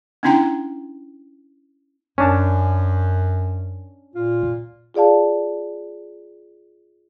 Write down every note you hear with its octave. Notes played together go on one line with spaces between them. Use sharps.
B3 C#4 D4 E4 G5 A#5
F#2 C#4 D4 A5
A#2 F4
F4 G#4 D5 F5 A5